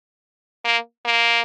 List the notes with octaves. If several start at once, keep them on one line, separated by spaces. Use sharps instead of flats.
A#3
A#3